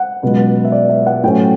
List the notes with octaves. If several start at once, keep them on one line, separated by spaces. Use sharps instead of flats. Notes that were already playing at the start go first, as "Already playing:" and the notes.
Already playing: F#5
C#2 B2 F#3
E5
D5
E5
F#5
A2 F#3 A3 C#4 G5